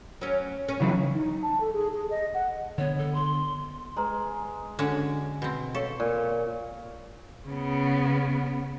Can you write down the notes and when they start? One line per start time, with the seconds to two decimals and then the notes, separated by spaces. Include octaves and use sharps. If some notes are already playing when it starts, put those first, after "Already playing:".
0.21 F#3 C#4
0.68 C#4
0.80 C#3 E3 F#3
1.14 D#4
1.43 A5
1.61 A4
1.73 G#4
1.92 G#4
2.10 D#5
2.34 F#5
2.78 D3 B3 C#5
2.98 A4
3.14 C6
3.97 G#3 B4 A#5 C6
4.79 D3 C#4 F#4
5.42 B2 C4
5.75 A4 C#5 F5 C6
6.00 A#2 D5
7.49 C#3 B3